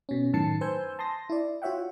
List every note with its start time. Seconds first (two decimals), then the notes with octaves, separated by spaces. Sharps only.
0.09 B2 C#4
0.33 F#2 A2 D#3 A5 C7 C#7
0.61 B4 C5 G#5 E6 G6
0.99 A5 C6 D#6 A#6
1.29 E4 D5
1.62 F4 F#4 C#5 E5 F#5 G5